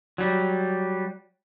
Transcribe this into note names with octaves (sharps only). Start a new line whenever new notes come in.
F#3 G3